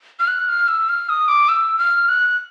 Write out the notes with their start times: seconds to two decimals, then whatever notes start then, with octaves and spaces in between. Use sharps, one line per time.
0.19 F6
0.28 F#6
0.48 F6
0.68 E6
0.89 F6
1.09 D#6
1.28 D6
1.49 E6
1.79 F6
2.09 F#6